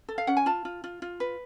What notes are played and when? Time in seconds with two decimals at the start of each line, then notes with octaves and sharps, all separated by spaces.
0.09 A4
0.18 F5
0.27 C#4 F#5
0.37 G#5
0.46 F4 A5
0.65 F4
0.84 F4
1.02 F4
1.20 B4